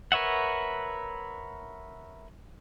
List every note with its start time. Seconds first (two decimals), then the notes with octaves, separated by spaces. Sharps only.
0.12 A#4 B4 C#5 E5 F#5